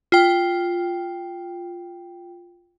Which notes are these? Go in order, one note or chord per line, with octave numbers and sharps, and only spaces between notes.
F4 G5